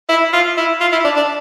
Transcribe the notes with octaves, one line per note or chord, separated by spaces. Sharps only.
E4
F4
E4
F4
E4
D4
D4